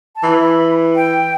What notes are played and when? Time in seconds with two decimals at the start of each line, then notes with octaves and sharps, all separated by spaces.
0.16 A5
0.23 E3 B5
0.96 G5